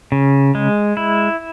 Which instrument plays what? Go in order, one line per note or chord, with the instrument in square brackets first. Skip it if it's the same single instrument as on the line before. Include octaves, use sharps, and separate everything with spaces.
[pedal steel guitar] C#3
G#3
E4